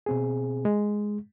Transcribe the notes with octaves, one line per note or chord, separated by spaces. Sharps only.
B2 C4 G#4
G#3